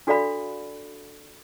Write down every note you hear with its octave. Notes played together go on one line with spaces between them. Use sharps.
D4 F#4 A4 D5 F5 B5